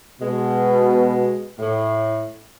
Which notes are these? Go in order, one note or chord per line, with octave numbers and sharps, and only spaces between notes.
B2 G#3
A2